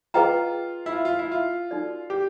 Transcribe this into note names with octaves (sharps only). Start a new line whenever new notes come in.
F4 G#4 B4 D#5 G5 A#5
E4
F4
F4
E4
F4
D#4 F#4 A4 D5
G4